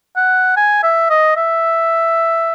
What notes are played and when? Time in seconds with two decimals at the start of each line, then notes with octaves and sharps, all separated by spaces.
0.17 F#5
0.57 G#5
0.83 E5
1.10 D#5
1.36 E5